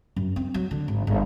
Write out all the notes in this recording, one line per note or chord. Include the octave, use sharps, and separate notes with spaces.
F#2
C4
F#3
D3
G#1
G1